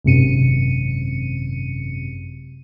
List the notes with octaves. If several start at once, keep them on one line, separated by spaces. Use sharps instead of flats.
G#1 F#2 C3 C#7 D#7